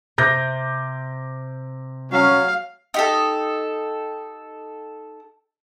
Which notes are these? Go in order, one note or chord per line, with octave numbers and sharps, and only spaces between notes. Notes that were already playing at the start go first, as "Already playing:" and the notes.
C3 D6 G6 A#6
F#3 C#4 F5
D#4 G4 A4